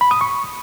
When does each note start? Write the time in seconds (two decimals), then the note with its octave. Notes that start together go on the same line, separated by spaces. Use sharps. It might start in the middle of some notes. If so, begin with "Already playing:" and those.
0.01 B5
0.11 D#6
0.21 C#6